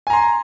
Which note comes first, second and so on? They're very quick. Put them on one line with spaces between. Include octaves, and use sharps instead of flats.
G#5 A#5 C6